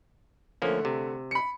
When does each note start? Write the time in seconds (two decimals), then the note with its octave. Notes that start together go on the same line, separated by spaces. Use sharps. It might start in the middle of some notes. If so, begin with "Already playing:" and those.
0.62 D3 F3 A3 A#3 C#4
0.85 C3
1.31 B5 C#7